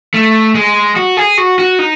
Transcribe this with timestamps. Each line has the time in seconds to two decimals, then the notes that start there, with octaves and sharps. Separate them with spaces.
0.14 A3
0.55 G#3
0.96 F#4
1.17 G#4
1.38 F#4
1.59 F#4
1.79 D#4